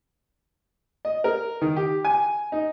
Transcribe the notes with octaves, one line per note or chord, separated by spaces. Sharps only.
D#5
A#4
D#3
G4
G#5
D#4